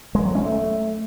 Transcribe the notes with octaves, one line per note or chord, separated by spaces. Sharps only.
G#3
F#3
C#4
A3